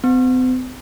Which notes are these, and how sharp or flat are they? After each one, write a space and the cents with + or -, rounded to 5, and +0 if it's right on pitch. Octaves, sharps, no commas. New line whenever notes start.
C4 -45